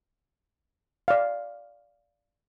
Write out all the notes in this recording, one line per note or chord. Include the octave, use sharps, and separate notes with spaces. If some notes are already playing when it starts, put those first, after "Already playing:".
D5 F5